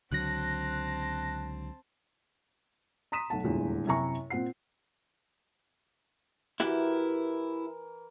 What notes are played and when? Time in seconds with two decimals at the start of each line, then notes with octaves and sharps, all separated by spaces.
0.11 C#2 D3 F#3 C4 A5 F#6 A#6
3.12 A#5 C6 D#6 B6 D#7 E7
3.30 B1 A3 F#5 A5
3.44 D#1 G#1 E2 D3 E3 F4
3.87 F#2 C3 E4 G#5 A#5 C#6
4.30 A#2 C4 F4 F#5 C7
6.60 E3 E4 F#4 G4 A#4